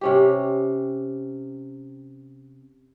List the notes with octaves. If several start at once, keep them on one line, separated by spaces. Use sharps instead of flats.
C3 C#4 G4